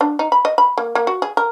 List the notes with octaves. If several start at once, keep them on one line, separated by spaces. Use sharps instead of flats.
D4
D#4
B5
D#5
B5
A#3
A#3
F#4
G#4
A#4